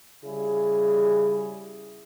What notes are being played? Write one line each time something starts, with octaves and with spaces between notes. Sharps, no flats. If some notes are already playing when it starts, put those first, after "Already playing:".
C#3 G3 E4 G#4